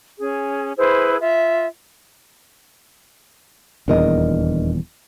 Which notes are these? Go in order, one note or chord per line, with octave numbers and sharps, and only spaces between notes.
C#4 G#4
E4 G#4 B4 C5
F4 E5
D#1 E2 D4 A#4 D#5